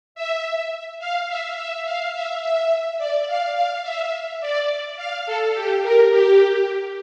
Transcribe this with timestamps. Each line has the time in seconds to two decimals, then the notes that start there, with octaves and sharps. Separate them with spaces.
0.15 E5
0.99 F5
1.29 E5
1.56 E5
1.85 F5
2.14 E5
2.42 E5
2.98 D5
3.27 F5
3.55 F5
3.83 E5
4.41 D5
4.97 F5
5.26 A4
5.54 G4
5.83 A#4
6.11 G4